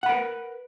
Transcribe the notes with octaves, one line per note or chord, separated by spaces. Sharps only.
A#4 B4 F#5 B5